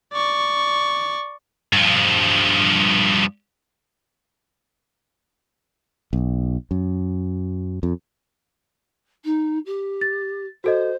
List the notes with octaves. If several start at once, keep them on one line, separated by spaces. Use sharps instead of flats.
D5 C#6
G2 F3
B1
F#2
F2
D#4
G4
A6
F#4 A4 C5 D#5